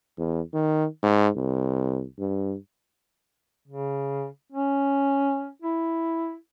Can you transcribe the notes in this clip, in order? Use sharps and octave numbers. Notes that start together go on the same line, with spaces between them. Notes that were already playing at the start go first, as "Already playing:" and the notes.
E2
D#3
G#2
C2
G2
C#3
C#4
E4